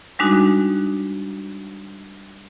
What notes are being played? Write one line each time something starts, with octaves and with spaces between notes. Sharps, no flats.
G3 G#3 D4 D#4 F#4